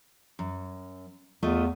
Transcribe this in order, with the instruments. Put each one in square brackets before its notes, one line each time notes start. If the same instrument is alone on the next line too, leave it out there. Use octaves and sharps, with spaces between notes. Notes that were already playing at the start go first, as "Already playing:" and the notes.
[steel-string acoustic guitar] F#2
[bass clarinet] E2 [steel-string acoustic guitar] A3 F4 D#5